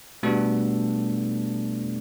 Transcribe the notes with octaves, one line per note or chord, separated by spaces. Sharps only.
B2 G3 A3 B3 D4 A4